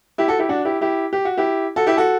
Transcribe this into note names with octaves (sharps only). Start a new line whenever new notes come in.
E4 G4
F#4 A4
E4 G4
D4 F#4
E4 G4
E4 G4
G4
F#4
E4 G4
F#4 A4
E4 G4
F#4 A4